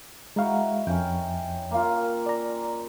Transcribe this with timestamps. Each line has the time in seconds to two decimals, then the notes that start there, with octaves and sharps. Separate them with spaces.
0.36 G#3 D#4 E4 F#4 F5
0.87 F2 C#4 G5
1.71 A#3 F4
2.26 D5 A#5